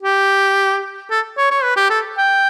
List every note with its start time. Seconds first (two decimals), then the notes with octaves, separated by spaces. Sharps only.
0.02 G4
1.11 A4
1.38 C#5
1.51 C#5
1.64 B4
1.77 G4
1.90 A4
2.18 G5